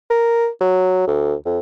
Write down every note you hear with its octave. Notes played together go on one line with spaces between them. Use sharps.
A#4
F#3
D2
F2